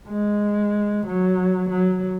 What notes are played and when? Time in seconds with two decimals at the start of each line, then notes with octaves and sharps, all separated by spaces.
0.08 G#3
1.06 F#3
1.70 F#3